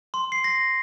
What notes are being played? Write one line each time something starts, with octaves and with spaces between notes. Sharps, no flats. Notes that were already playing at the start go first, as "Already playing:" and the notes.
C6
C7
A#6